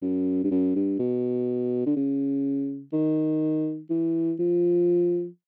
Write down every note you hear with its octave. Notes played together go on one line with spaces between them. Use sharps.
F#2
G2
F#2
G2
B2
D3
C#3
D#3
E3
F3